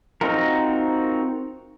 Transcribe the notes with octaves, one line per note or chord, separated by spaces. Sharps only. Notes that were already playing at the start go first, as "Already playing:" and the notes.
C4 D#4 F4 F#4 A#4